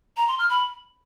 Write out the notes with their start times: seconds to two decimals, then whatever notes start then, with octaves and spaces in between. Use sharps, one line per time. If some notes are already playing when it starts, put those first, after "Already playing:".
0.17 A#5
0.28 C6
0.39 F6
0.50 B5